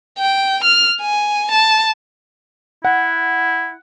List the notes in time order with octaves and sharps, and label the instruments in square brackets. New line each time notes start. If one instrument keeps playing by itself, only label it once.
[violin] G5
F6
G#5
A5
[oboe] E4 [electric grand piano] F#5